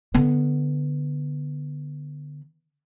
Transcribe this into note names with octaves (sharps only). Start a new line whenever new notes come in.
D3 B3